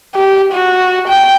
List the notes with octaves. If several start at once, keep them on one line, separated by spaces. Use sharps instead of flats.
G4
F#4
G5